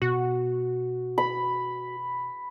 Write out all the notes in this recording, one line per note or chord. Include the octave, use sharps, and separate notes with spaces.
B2 F#4
B5